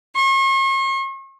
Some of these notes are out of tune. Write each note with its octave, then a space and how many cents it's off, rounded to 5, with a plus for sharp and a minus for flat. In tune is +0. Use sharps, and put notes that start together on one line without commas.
C#6 -45